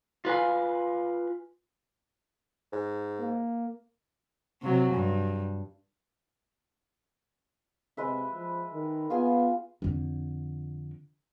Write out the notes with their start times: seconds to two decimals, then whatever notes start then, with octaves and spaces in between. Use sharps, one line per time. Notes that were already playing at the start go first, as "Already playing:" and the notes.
0.25 F4 B4 F5 G#5
2.72 G#2
3.19 A#3
4.62 C3 F#3
4.93 G2
7.97 C3 G#3 B4 E5
8.34 F3
8.73 D#3
9.10 B3 F4 G#4 G#5
9.82 F2 D3